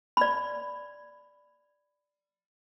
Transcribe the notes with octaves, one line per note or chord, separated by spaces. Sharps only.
D5 B5